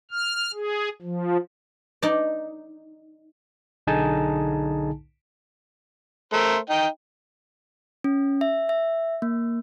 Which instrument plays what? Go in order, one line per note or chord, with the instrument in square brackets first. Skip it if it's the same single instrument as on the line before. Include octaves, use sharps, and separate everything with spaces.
[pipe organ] F6
G#4
F3
[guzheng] D#4 D5
[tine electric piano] B1 D3 D#4 G#4 G#5 A5
[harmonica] A3 A#4 C5
D#4 G5
[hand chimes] C#4
E5
E5
A#3